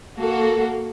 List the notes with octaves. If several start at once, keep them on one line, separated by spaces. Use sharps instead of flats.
A#3 F#4 A4